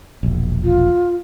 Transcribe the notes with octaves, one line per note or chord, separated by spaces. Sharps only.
E1 A#1
F4